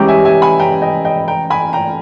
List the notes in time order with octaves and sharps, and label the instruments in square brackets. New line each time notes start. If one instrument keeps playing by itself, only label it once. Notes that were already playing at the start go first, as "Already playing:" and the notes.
Already playing: [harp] E3 G#3 C#4 E4 G4 [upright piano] G5 A#5
[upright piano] E5 G#5
E5 G#5
G#5 B5
G5 A#5
D#5 G5
D#5 G5
G5 A#5
G#5 B5
G5 A#5